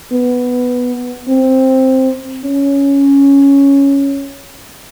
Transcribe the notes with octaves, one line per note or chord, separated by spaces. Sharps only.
B3
C4
C#4